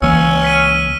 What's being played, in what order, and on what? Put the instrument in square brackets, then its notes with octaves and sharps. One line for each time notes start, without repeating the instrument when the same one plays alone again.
[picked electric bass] C#2 E3 A#3 [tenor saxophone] C#4 [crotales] E6
[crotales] F6 B6 D#7